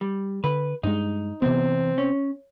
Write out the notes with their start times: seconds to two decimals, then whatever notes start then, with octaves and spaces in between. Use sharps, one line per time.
0.01 G3
0.44 D3 B4
0.83 G2 G#3 D#4
1.42 E2 C3 B3 C4
1.98 C#4